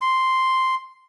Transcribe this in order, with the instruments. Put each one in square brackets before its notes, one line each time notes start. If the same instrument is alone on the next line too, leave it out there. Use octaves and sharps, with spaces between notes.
[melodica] C6